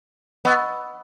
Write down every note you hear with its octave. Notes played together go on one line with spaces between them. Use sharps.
B3 D#5 F#5 C#6 E6